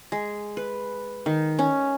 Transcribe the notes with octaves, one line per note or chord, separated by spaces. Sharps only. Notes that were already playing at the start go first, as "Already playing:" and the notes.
G#3
B4
D#3
C#4